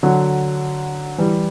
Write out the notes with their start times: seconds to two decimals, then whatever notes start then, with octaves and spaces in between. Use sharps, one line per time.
0.03 D3 F#3
1.18 E3 G3